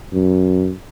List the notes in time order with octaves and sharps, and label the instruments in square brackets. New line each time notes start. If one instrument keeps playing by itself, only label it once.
[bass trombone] F#2